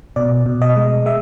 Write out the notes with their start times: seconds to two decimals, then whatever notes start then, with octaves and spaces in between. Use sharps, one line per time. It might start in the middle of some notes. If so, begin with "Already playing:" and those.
0.16 B2 D5
0.46 B2
0.62 D#5
0.76 G#3
1.06 G#3 E5